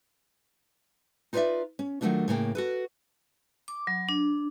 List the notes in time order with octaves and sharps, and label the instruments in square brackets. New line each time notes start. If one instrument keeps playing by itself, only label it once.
[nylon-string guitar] D#4 F4 B4 C#5 D5 E5
C#4
D#3 F#3 G3 A3 D4 F4
A2 C#3 A#3 G5
F#4 A4 B4
[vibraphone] D6
F#3
D4